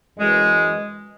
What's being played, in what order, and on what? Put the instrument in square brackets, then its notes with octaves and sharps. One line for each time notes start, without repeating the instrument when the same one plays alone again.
[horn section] F#2 E3 G#3